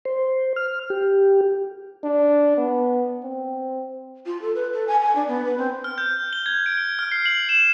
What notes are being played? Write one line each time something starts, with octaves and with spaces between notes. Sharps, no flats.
C5
F6
G4
D4
B3
C4
F4
A4
B4
A4
G#5
G#5
D4
B3
B4
C4
F6
G6
G7
G#6
D7
F6
C7
F#7
E7